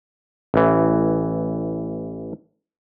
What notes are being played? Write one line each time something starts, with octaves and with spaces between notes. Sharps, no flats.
A1 E3